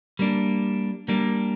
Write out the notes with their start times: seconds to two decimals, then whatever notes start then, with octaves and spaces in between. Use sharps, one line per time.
0.19 G3 A#3 D4
1.08 G3 A#3 D4